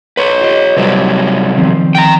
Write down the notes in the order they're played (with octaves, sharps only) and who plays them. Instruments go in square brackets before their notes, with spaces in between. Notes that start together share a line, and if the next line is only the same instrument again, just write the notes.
[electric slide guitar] B4 C#5
[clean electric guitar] F4 G4 D#5
[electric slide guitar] C3 F#3 G3
[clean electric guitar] D#3 F3 C4
[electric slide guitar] G5 A#5